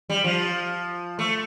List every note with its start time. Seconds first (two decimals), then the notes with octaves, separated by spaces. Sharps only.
0.10 G3
0.24 F3
1.19 A3